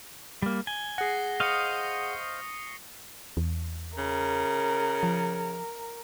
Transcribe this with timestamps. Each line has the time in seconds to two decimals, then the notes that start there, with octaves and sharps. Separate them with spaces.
0.42 G3 A#3
0.67 G#5 G7
0.98 G#4 F#5 A#6 C7
1.40 C5 D#5 F5 C#6 D#6 C#7
3.37 E2
3.98 C#3 A#4
5.03 F3